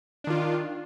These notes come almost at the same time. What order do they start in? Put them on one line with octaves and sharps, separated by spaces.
D4 D#3 F4